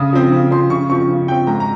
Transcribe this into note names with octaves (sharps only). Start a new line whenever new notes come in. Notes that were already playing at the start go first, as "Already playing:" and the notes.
Already playing: C#3 D#6
F3 C4
C#3
F3 C4 C6
C#3 C#6
F3 C4 C#6
C#3
F3 C4 G5
G#2 A#5
A#5